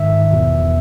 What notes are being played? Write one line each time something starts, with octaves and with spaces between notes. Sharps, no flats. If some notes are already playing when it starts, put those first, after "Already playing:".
Already playing: G#2 D#3 E5
E2 B2